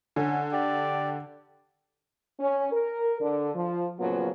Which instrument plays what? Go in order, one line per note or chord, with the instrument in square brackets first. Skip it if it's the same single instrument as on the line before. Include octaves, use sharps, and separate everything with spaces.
[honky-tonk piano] D3 [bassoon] C#4
[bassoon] G4 [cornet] D5
[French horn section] C#4
A#4
D3
F3
A#2 C#3 F3 F#3 B3